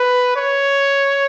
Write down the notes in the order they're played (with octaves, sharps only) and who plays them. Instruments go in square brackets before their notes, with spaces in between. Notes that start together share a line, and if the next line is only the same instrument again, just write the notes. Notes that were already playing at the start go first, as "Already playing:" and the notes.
Already playing: [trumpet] B4
C#5